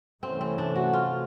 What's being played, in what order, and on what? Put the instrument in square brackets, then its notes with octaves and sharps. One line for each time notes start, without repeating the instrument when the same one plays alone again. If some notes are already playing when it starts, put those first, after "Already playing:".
[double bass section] C3 E3 A3 C#4 [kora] C4
[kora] C4
D4
F#4
F4